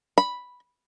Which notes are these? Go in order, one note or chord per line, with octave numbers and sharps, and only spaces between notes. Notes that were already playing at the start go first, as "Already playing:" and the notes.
B5